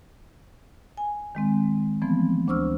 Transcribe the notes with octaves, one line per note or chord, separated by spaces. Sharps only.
G#5
D#3 G#3 C4
E3 F3 A3 B3 C4
D2 D4 C5 C#6 E6 F6